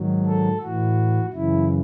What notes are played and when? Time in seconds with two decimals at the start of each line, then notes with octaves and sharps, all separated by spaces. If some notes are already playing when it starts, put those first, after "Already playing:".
Already playing: G#2 D#3 F#3
0.26 A4
0.62 A2 E3 F#4
1.33 F#2 C#3 E3 E4